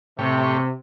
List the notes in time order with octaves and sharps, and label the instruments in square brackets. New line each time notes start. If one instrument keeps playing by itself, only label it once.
[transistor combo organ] A2 G4 C#5 [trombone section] C3